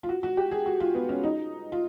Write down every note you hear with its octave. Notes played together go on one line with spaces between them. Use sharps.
F4
F#4
F#4
G4
G#4
F#4
F4
B3
C#4
D#4
F4